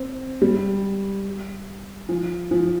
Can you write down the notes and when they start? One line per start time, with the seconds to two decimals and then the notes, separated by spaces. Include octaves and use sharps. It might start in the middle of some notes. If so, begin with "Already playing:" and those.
Already playing: C4
0.42 G3
2.09 F3
2.51 F3